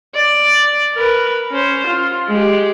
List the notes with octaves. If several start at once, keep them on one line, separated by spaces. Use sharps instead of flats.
D5
A#4 B4
C#4 C5
F4
G#3 G4